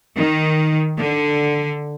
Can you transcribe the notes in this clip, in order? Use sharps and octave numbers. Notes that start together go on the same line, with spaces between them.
D#3
D3